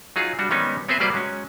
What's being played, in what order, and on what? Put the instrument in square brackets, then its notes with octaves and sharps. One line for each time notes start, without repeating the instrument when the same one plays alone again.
[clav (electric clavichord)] F#3 D#4 F4 G#4
G3 D4 F#4
D#3 G3 G#3 B3 C#4 D#4
B3 C4 G#4 B4 C5 E5
F#3 G3 A#3 B4 C5 D5
F#3 G#3 C#4